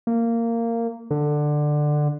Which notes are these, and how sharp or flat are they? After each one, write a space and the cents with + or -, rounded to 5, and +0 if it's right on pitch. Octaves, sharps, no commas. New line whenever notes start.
A#3 -15
D3 +15